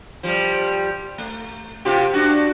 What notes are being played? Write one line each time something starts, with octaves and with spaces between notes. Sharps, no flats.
F3 G3
A3
C3 F4 G4
D4 F#4